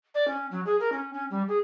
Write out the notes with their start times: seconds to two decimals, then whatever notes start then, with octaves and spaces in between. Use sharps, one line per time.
0.15 D5
0.28 C#4
0.51 F#3
0.66 G#4
0.80 A#4
0.92 C#4
1.14 C#4
1.31 G3
1.48 G#4